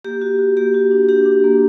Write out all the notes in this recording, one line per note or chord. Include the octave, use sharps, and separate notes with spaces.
A#3 G4
F#4
F#4
A#3 G4
F#4
D4
D4 G4
D4
A#3